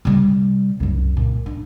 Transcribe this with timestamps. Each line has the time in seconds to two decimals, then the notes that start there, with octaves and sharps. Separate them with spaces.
0.05 C3 G3
0.80 C2 F#2
1.17 A#2
1.46 D4